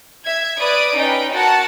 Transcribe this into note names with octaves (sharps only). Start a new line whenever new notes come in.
E5 G#6
B4 D5 B5 D#6 D7
C#4 D#4 B4 G5
F#4 A#4 F#5 A5